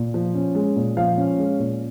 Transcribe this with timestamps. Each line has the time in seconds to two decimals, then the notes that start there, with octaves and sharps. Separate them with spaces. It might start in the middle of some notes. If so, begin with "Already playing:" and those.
Already playing: A#2
0.14 F3
0.35 C#4
0.55 G#3
0.76 A#2
0.97 F3 F5
1.18 C#4
1.39 G#3
1.59 A#2